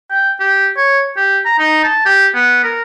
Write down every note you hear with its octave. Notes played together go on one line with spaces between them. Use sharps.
G5
G4
C#5
G4
A#5
D#4
A5
G4
B3
A#4